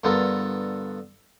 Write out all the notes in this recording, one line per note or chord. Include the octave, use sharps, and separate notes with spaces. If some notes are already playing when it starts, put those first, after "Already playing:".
G2 D3 B3 F4 A4 A#4